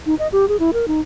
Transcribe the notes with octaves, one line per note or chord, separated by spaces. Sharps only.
D#4
D#5
G4
G#4
E4
A#4
D#4